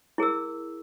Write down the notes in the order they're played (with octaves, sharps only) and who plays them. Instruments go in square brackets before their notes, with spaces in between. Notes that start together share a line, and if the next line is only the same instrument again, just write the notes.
[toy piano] E4 G#4 A#4 E6